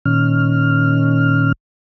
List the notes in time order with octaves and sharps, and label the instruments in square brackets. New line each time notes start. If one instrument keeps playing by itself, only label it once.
[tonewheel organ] A#2 D#3 C#4 F6